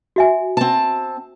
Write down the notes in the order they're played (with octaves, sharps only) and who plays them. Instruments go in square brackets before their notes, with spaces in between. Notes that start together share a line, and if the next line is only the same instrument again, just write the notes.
[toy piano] F#4 E5 G#5
[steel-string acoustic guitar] C4 A5